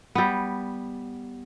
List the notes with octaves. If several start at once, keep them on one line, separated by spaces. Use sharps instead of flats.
G3 B3